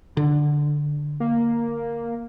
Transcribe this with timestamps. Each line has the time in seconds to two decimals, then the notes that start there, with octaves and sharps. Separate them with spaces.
0.17 D3
1.20 A#3